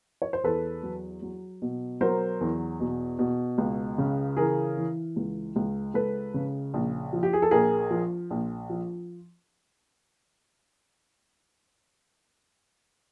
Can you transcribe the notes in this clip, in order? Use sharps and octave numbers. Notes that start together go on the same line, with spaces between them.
C#5
C5
E2 A4 B4
F#3
F#3
B2
F#3 A#4 C5
E2
B2
B2
C#2
C#3
E3 G#4 A#4
E3
C#2
C#2
C#2 A4 B4
C#3
A#1
F3
G4
G#4
A4
A#1 G#4 A#4
F3
A#1
F3